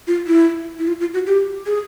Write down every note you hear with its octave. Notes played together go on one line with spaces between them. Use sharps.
F4
E4
E4
F4
F4
F#4
G4
G#4